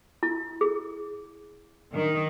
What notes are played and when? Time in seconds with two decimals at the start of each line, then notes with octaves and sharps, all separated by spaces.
0.23 E4
0.61 G#4
1.94 D#3